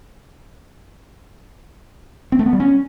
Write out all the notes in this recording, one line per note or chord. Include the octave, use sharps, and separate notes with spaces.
C4
A3
B3
G3
C#4